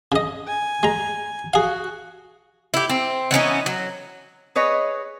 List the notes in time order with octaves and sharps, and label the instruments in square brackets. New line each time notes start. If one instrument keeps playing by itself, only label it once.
[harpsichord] C#3 D#5
[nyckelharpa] G#5
[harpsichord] G#3 A#5
[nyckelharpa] F#4 [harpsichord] G#4 F5
[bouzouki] E4 G4
C4
E3 B3 C#4 D#4
F#3
[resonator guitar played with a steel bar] G#4 B4 C#5 D#5